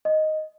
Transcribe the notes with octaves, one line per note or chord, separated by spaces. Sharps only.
D#5